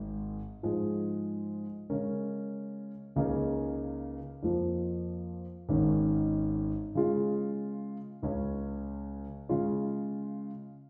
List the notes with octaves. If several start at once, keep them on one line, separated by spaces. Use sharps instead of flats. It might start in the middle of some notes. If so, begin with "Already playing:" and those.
Already playing: G#1 G#2 D#3 G#3
G#2 F3 G#3
C#3 G#3 C#4 A#4
C#2 C#3 A#3 D#4 G#4
F2 F3 A#3
G#1 G#2 D#3 C#4
C#3 G#3 F4 G#4
C#2 C#3 G#3 C#4
C#3 G#3 F4 C#5